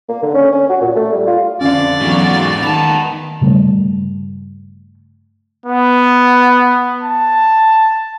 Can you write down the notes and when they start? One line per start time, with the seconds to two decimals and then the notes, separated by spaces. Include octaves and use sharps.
0.09 A#3
0.22 D3
0.34 C#4
0.52 C#4
0.69 F#4
0.81 A#2
0.95 A3
1.13 G3
1.27 F4
1.61 F2 D3 C#4 D4 D5 F5
2.00 E2 G#2 F#3 F4 F#4
2.62 D#3 B3 A5 F7
3.41 G2 C#3 G3 A3
5.66 B3
7.03 A5